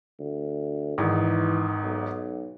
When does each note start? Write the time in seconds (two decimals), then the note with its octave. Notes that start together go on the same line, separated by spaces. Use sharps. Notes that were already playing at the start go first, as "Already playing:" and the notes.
0.19 D2
0.98 G#1 G#2 E3
1.83 B1